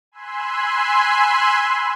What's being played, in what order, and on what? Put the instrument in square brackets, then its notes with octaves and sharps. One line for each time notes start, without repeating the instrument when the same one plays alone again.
[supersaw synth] G#5 B5 C6 E6 F#6